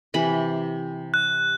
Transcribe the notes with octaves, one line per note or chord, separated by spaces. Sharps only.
C3 E3 B5
F#6